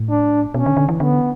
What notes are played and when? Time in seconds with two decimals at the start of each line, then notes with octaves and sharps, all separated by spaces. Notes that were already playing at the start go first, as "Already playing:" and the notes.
Already playing: A2
0.10 D4
0.54 B2 C#4
0.66 D3
0.77 D3
0.89 E3
1.00 D3 B3